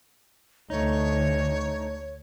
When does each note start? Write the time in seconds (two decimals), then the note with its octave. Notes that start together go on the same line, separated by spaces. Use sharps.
0.70 D2 D3 A3 D#4 C#5